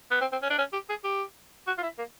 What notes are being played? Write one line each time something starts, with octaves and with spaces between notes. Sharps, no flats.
B3
C4
C4
C#4
D4
C#4
G4
G#4
G4
F#4
F4
E4
A#3